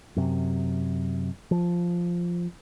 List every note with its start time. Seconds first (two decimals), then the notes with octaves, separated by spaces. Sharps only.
0.16 F#2 C3
1.51 F3